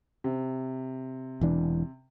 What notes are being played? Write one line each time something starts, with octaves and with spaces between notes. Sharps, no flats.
C3
E1 E3 D4